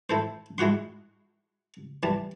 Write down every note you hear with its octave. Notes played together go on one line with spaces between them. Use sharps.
E4 A4 C5
G#3 E4 F#4 F#5 C6
E3 G3 A5